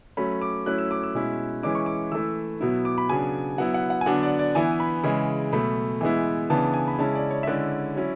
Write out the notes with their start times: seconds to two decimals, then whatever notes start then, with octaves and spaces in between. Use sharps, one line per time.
0.17 F#3 A3 C#4 B5
0.42 D6
0.66 F#3 A3 C#4 E4 F#6
0.78 E6
0.91 D6
1.03 E6
1.14 B2 G#3 C#4 E4
1.63 E3 G#3 C#4 E4 D6
1.75 C#6
1.86 D6
2.12 E3 A3 E4 E6
2.60 B2 F#3 B3 E4
2.85 D6
2.98 B5
3.09 C#3 F#3 B3 D4 G#5
3.58 F#3 B3 E4 F#5
3.74 F#5
3.90 F#5
4.01 G#5
4.06 D3 F#3 B3 D4 F#5
4.23 D5
4.39 D5
4.55 E3 B3 E4 G#5
4.80 B5
5.04 C#3 E3 G#3
5.53 B2 F#3 A3 B5
6.01 E3 G#3 B3 E4
6.50 C#3 E3 B3 D4 A5
6.74 G#5
6.88 B5
6.98 C#3 G#3 C#4 E4 A5
7.15 D5
7.31 C#5
7.43 E5
7.47 D3 G#3 C#4 E4 D5
7.96 F#3 C#4 E4